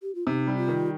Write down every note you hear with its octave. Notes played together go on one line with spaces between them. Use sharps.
G4
F4
C3 D#4
G3
F4
D#3